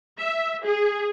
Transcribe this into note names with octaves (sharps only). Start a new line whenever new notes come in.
E5
G#4